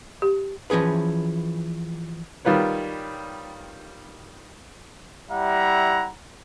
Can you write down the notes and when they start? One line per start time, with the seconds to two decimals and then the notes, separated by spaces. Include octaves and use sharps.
0.22 G4
0.70 E3 F3 C#4 G#4 B4
2.45 D#3 G3 F4 B4 C#5
5.30 G3 E4 E5 F#5 A#5